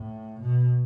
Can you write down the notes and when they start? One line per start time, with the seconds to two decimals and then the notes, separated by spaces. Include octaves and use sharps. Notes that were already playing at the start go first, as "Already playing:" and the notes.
Already playing: A2
0.41 B2